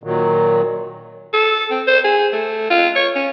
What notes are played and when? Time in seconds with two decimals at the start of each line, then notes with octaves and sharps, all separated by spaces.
0.04 A#2 D#3 F#3
1.33 A4
1.71 C4
1.87 C5
2.04 G#4
2.33 A3
2.70 F4
2.95 C#5
3.15 C#4